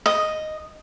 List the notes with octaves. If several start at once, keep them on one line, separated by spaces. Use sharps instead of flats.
D#5